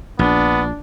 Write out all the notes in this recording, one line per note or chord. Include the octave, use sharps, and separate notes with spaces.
A#1 B3 D4